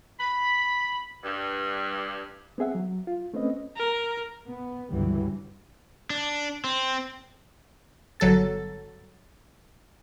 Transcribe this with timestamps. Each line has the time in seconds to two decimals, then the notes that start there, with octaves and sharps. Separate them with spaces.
0.19 B5
1.24 G2
2.58 B3 C4 G#4 E5 F#5
2.75 F#3
3.07 F4
3.34 A3 C4 C#4 B4 D#5
3.77 A#4
4.45 B3
4.91 C#2 G2 D3 E3 F#3 G3
6.10 D4
6.64 C4
8.20 G1 F#3 A4 A6